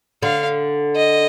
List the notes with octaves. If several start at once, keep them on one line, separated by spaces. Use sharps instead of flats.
D3 F5
D#5